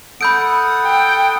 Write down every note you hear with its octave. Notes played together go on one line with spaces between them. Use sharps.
A4 F#5 B5 D#6 G6 D7
G5